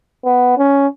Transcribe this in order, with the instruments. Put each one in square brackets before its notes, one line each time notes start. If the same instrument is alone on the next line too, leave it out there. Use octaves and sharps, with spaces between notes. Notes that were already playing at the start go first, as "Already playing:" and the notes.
[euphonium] B3
C#4